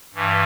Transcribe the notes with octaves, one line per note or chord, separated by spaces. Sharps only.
G2 E3